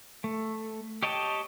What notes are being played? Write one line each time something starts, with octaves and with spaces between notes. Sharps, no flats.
A3
G4 C#5 D#5 G5 A5